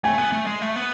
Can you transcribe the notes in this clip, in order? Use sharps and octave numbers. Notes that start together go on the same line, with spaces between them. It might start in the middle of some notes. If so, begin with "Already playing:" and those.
A3 G#5
B3
A3
G#3
A3
B3